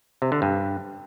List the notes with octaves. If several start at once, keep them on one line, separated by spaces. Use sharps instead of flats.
C3
D3
G2